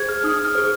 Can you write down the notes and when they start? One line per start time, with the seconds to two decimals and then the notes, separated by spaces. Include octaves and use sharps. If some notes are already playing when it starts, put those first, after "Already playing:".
Already playing: G#4 C5 G#6
0.09 F6
0.24 D#4 D#6
0.45 F6
0.55 G#4 C5